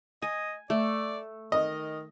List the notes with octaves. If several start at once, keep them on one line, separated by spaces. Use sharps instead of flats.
D#5 G#5
A3 D5
D#3 D#5